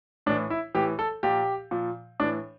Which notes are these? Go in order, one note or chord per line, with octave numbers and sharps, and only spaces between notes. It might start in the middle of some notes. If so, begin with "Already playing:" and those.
A2 E3 D4
E4
A2 E3 G4
A4
A#2 F3 G4
A#2 F3
A2 E3 D4